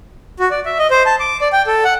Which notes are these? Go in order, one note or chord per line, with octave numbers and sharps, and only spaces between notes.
F#4
D5
E5
D#5
C5
A5
D6
D5
G5
A4
F#5